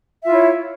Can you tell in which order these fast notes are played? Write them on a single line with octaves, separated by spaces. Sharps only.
E5 F4 E4 C#5